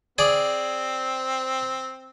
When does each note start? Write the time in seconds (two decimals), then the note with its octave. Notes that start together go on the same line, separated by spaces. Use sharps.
0.18 C4 G#4 D5